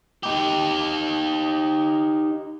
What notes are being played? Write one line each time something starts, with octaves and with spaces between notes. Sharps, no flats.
D#4 G4